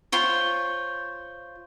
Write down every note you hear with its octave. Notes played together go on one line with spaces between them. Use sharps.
F4 C5 C#5